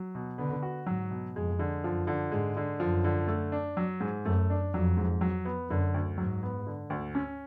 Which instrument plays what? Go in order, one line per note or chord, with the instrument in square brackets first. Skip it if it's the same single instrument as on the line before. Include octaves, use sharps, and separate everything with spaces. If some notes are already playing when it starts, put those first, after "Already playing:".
Already playing: [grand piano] F#3
B2
[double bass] D3 [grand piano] B3
[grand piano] F#4
[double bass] G#2 [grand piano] F#3
[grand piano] B2
[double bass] F2 [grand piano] G#3
[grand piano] D3
[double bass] F#2 [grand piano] F3
[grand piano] D3
[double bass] G#2 [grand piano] G#3
[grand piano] D3
[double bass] F#2 [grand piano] F3
[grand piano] D3
A3
D4
F#3
G#2
[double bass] F#2 [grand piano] A3
[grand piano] D4
[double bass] F2 [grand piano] F#3
[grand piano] G#2
F#3
B3
[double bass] F#2 [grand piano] D3
[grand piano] D2
[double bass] G#2 [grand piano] F#3
[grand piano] B3
D3
D2
C#4